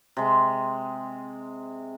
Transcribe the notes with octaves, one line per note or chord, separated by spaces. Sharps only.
C3 G#3